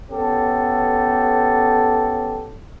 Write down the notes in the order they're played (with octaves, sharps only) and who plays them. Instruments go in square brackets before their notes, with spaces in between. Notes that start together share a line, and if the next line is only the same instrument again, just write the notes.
[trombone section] B3 C#4 G4 A4